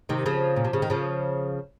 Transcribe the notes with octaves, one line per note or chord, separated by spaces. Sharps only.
C3 D#3
C#3 F3
A#2
C3
C#3
D#3
C#3 F3